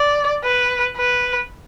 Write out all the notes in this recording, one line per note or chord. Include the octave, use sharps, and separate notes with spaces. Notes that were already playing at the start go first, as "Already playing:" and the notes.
Already playing: D5
B4
B4